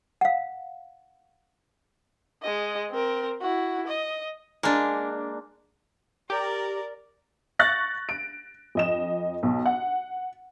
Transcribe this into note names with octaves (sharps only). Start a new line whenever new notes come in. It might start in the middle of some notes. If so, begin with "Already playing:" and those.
F5 F#5
G#3 D#5
C4 A#4
E4 F#4
D#5
G#3 A#3 D4
G4 A#4 D5
C#6 F#6 A6 A#6
D7
F2 D#5 E7
B1
F#5